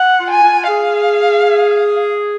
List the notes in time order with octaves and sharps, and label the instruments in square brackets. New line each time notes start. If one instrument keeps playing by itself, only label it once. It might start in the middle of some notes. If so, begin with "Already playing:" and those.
Already playing: [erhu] F#5
[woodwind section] F4
[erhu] G#5
[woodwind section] F4
[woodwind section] G#4 [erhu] F5